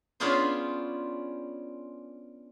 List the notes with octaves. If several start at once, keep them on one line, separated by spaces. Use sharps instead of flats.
B3 C#4 D4 F4 G#4 C5